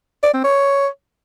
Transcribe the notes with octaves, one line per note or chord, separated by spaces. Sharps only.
D5
C4
C#5